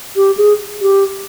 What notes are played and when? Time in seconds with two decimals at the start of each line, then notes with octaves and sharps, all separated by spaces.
0.16 G4
0.37 G#4
0.81 G4